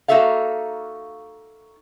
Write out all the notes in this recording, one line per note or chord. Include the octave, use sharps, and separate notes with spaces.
A#3 D#4 F#4 A4 E5 F5